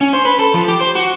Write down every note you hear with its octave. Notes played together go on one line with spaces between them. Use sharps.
C#4
C5
B4
A4
F3
G4
C5
F#4